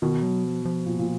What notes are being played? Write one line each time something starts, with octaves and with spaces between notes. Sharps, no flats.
B2 D#3
F#3
F3
F3
A#2
A#2